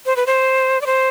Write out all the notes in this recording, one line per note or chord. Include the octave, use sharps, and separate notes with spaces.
C5
B4
C5
D5
C5